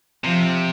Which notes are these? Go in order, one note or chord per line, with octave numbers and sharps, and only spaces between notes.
C3 F3